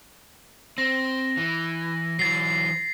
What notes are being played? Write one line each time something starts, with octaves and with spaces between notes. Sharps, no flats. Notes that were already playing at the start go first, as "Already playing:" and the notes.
C4 A#6
E3
E3 F#3 A6 C7